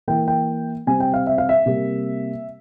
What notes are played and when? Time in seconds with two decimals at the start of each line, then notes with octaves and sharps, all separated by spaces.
0.08 E3 A#3 G5
0.28 G5
0.87 C3 G3 C4 G#5
1.00 G5
1.14 F5
1.27 E5
1.38 F5
1.49 E5
1.66 C3 G3 A#3